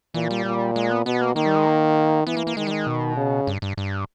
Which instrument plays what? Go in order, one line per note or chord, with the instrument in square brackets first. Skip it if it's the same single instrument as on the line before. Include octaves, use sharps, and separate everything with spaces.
[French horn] A#2 [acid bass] E3
[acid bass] G3
[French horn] A#2
[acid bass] G#3
B3
[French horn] B2 [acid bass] B3
[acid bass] A#3
[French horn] D#3 [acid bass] A#3
[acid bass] G3
G#3
A#3
[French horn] E3 [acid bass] B3
[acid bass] A#3
A#3
[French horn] D#3 [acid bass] G#3
[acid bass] G3
G#3
B2
[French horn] C#3
[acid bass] G2
G2
G2